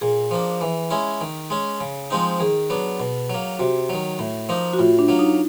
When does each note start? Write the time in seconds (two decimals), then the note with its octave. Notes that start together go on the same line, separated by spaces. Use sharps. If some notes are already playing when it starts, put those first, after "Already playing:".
0.01 A#2 G#4
0.31 F3 A#3 D4
0.61 E3
0.90 G#3 C#4 E4
1.21 D#3
1.50 G#3 C#4
1.81 C#3
2.10 F3 G#3 C4 D#4
2.40 D#3 G#4
2.70 F#3 B3 D4
3.00 B2
3.30 F#3 A#3
3.59 C3 F#4
3.89 D#3 F#3
4.19 A2
4.49 F3 A#3 D#4
4.73 F#4
4.79 A2 F4
4.99 D4
5.08 F#3 A#3
5.19 D#4